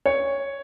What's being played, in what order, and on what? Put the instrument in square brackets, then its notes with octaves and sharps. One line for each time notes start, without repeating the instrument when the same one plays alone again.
[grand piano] C#5